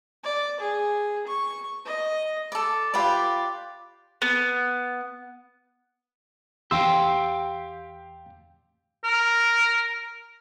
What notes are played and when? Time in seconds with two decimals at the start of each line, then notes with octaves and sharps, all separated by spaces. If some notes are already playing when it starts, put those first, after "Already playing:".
0.24 D5
0.60 G#4
1.27 C#6
1.85 D#5
2.52 A4 D5
2.94 F4 G4 B4 D5
4.22 B3
6.71 E2 G4 F5 G5 C6 E6
9.04 A#4